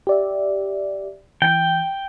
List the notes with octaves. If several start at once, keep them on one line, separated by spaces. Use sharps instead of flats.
G4 D5 E5
E3 G5